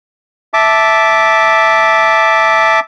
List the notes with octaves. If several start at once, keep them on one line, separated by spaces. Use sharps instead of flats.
E5 A5 D6